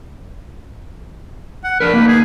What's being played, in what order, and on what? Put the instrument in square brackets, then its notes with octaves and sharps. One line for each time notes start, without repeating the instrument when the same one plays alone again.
[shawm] F#5
[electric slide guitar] D4 A#4 [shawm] B4
[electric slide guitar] A#3 D#4
[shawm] G#4